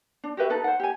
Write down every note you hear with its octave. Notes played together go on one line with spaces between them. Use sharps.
D4
F#4 G4 B4 E5
D#4 A4 B4
C5 F#5
G4 G#5